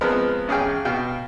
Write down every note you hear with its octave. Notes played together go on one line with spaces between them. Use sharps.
F3 G#3 B3 C4 A#4
A1 C#4 G#4 F5 G5
B2 F5 G5